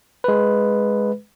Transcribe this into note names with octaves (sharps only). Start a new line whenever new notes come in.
G#3 B4